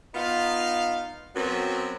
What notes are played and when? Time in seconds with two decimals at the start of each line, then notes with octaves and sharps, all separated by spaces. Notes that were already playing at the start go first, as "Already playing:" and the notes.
0.14 B3 D#4 F4 F5
1.36 F#2 F#3 B3 C4